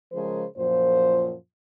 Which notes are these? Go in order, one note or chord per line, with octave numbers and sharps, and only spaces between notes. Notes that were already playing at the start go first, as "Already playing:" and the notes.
C#3 F3 G#3 G#4 A#4 C5
F#2 A#2 F3 C5